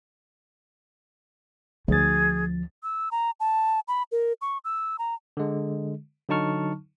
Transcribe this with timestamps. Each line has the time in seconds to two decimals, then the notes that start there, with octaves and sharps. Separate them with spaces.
1.88 D2 F3 G#4 A6
2.83 E6
3.11 A#5
3.40 A5
3.88 B5
4.12 A#4
4.41 C#6
4.64 E6
4.99 A#5
5.37 D3 G#3
6.29 D3 F#3 D#4 A5 C#6 F6